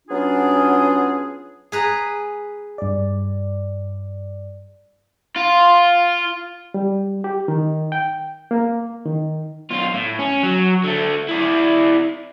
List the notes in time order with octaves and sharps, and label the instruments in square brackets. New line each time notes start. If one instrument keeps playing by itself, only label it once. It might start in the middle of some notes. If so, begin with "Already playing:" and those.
[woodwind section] F#3 B3 C#4 D4 F4 G#4
[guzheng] G#4 B4 A#5
[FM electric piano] G2 D5
[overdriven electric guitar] F4
[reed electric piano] G3
G4
D#3
G5
A#3
D#3
[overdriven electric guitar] B1 F4
A2
C#4
F#3
D3 A3
E4 D5